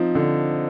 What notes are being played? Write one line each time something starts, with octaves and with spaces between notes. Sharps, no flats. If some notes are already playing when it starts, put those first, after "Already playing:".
Already playing: F3 C4 D#4
D3